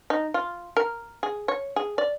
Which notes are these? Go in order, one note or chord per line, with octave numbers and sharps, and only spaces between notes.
D#4
F4
A#4
G#4
C#5
G#4
D5